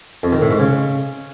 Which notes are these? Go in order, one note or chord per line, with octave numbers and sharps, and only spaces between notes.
F2
D#3
A2
G#2
C#3